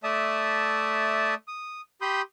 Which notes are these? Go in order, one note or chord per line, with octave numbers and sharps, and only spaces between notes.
A3 D5 E5 A5 D#6
D#6
G4 B5 C6 D#6 G6